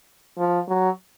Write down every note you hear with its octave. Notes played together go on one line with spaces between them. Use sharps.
F3
F#3